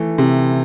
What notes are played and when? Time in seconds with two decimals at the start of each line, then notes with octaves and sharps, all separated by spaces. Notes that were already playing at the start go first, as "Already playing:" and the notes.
Already playing: E3 A3
0.18 C3